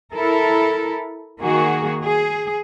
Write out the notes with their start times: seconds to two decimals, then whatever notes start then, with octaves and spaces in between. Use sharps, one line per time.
0.13 E4 A4 A#4
1.39 D#3 A#3 F#4 G#4
2.04 G#4